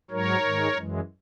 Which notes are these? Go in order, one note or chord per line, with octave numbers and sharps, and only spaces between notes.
G#2 F#3 A#4 C#5
G#2 D#3 G#3
F#2 E3 G#3